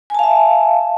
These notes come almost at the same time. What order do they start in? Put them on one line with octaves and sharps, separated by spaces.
G#5 A5 F5 E5